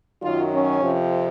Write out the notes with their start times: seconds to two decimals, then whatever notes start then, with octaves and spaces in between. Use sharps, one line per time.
0.21 F#2 D#3 F#3 F4
0.51 C#4
0.81 F2 C3 F3